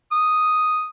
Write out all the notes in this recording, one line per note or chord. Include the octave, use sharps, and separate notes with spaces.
D#6